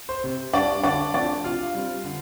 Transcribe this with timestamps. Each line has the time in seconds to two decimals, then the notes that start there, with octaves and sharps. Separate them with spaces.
0.09 C5
0.24 C3
0.53 G3 D4 D5
0.83 D3 D4 D5
1.14 F3 A3 C4 D4 D5
1.44 C3 F4 F5
1.74 G3 C4
2.04 D3